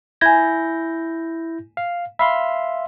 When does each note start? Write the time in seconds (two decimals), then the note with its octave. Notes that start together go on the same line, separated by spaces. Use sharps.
0.21 E4 G#5 G6 G#6 A#6
1.77 F5
2.19 E5 F5 B5 C6